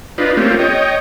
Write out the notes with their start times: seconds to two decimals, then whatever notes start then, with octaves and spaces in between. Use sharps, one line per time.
0.18 D4 D#4 F4 B4
0.37 A3 A#3 C4 C#4 F4 G4
0.59 C#5 D#5 G5